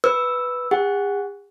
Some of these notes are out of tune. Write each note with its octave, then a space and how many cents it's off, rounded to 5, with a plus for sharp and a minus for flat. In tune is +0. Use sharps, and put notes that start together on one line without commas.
B4 +0 E6 +0
G#4 -45 F#5 +0